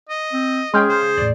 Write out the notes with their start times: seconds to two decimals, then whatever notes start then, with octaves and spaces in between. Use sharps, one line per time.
0.09 D#5
0.33 C4
0.74 G#3 C#4 G#4 G5 C6 F6 G6
0.89 C#3 C5
1.17 E2 A2 D5